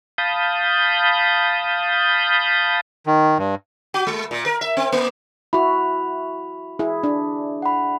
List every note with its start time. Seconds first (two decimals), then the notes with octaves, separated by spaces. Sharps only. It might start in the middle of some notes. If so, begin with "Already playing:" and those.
0.18 F5 A5 B5 D#6 G6
3.07 D#3
3.38 G2
3.94 F#4
4.07 G#3
4.31 A#2
4.46 A#4
4.61 E5
4.77 C4
4.92 A#3
5.53 E4 F#4 B5
6.79 E4 G#4
7.04 D4
7.62 F#5 B5